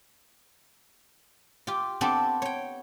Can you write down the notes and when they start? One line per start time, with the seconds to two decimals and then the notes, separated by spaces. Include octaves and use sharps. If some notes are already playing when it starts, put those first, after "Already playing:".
1.67 F4 G4
2.01 B3 C4 D4 G4 A4 C5
2.42 C#5 G5